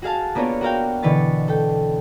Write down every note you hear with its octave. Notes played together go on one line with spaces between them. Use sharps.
F#4 G#4 F5 A5
A#3 B3 D4 F4 A#4 C#5
F#4 A#4 F5 G5
B2 D3 E3 B4 C#6 A6
A4 G5